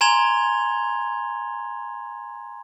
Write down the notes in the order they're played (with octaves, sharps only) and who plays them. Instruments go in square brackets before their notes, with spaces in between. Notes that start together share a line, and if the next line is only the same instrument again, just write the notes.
[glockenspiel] G#5 A#5 C6 G#6 F7 G7